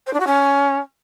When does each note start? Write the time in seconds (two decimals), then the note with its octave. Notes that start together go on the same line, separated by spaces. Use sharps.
0.06 C5
0.13 D4
0.20 F#4
0.27 C#4